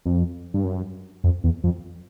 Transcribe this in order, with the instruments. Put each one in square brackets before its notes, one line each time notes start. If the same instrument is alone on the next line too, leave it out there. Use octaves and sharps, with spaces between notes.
[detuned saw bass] F2
G2
F#2
F2
E2
F2